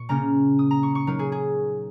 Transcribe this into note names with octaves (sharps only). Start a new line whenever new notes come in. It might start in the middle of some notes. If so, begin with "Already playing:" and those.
Already playing: A#2 C#6
C#3 A#3 C#4 A#5
D#6
A#5
C#6
C#6
F#3 D#4 A#4
G#4
G#4